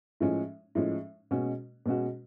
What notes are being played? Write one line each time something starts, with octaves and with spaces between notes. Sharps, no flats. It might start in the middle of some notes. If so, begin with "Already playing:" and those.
A2 F3 G#3 C#4
A2 F3 G#3 C#4
B2 G#3 C#4 F#4
B2 G#3 C#4 F#4